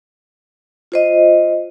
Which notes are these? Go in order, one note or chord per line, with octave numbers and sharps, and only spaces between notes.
F4 C5 D#5